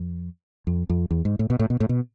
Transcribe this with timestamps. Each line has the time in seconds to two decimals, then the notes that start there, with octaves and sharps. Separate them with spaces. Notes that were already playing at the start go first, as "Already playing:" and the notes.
Already playing: F2
0.67 F2
0.89 F2
1.11 E2
1.25 G#2
1.39 A2
1.50 B2
1.59 A2
1.70 B2
1.80 A2
1.89 B2